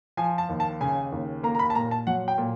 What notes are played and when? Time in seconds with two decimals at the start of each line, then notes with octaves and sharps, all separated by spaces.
0.17 F3 G#5
0.38 A5
0.49 D#2
0.60 A5
0.81 C#3 G#5
1.12 D#2
1.43 A#3 A#5
1.55 A#5
1.59 B5
1.70 A5
1.75 A#2 A#5
1.91 A5
2.07 F#3 F#5
2.28 G5
2.38 A#2